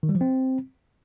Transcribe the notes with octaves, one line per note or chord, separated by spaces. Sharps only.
D#3
G3
F3
C4